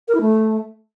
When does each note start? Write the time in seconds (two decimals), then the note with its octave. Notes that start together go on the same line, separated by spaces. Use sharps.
0.08 A#4
0.14 E4
0.21 A3